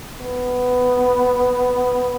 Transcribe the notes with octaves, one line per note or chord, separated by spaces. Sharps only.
B3